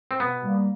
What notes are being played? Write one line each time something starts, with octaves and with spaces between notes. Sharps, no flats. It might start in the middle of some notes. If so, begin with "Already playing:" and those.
C4
B2 B3
G3 A#3